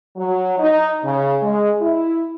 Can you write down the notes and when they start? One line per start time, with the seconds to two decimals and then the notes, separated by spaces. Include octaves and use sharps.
0.16 F#3
0.59 D#4
1.04 C#3
1.42 G#3
1.81 E4